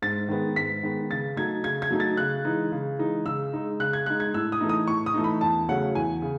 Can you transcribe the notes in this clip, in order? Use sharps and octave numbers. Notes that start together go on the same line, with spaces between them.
G#2 A6
D#3 G#3 B3
G#2 B6
D#3 G#3 B3
C#3 A6
F#3 A3 D#4 G#6
C#3 G#6
G#6
F#3 A3 D#4
A6
C#3 F#6
E3 G#3 D#4
C#3
E3 G#3 D#4
C#3 E6
G#3 D#4
C#3 F#6
G#6
G#3 D#4 F#6
G#6
A2 E6
D#6
E3 A3 D#4
D#6
A2 C#6
D#6
E3 A3 D#4
B5
E2 A5
C#3 F#3 A3 C#4 F#5
E2 G#5
C#3